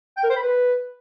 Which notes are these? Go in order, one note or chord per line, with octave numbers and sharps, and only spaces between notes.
G5
A#4
C5
B5
B4